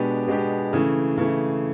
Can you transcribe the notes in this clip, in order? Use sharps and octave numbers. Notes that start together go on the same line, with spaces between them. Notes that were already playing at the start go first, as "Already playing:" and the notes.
Already playing: B2 G#3 B3 D4 G4
B2 G#3 B3 D4 G4
C#3 E3 A3
C#3 E3 A3